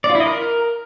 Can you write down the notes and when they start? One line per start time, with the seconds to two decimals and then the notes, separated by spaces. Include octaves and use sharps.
0.04 D5
0.10 F4
0.15 E4
0.20 D#5
0.26 A#4